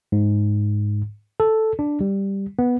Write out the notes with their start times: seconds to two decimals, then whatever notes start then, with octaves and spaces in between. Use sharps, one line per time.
0.12 G#2
1.40 A4
1.79 D4
2.01 G3
2.59 B3